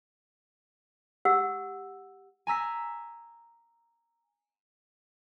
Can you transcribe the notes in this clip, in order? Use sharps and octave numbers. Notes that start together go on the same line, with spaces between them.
G4 F#5 E6
G#5 A#5 E6 B6